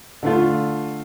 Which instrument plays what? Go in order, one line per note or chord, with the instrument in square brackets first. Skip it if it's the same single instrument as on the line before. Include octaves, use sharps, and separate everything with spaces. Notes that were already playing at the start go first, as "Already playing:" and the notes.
[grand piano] D3 A3 F4